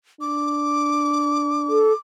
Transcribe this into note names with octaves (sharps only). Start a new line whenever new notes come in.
D4 D6
A4